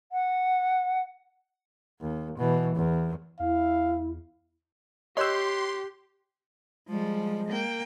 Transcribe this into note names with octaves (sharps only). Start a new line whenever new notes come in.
F#5
D#2
B2 E3
E2
E2 E4 F5
G4 C#5 D#5 C6 E6 F#6 G6
F3 G3 G#3
A#3 G5